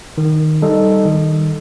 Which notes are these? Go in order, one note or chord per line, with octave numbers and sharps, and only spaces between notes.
D#3
G3 D#4 A4 D#5
D#3